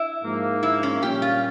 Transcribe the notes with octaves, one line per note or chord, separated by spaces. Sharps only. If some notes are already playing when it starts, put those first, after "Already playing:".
Already playing: E4
G#2 F3 A#3
E4
C#4
A#2 G3 C#4 G4
F4